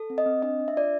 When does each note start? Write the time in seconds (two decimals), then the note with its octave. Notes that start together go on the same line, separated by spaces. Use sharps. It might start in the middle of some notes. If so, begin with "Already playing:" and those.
Already playing: A4
0.10 C4
0.18 D#5
0.26 C4
0.42 D4 D#5
0.59 D4
0.68 E5
0.76 F4 D5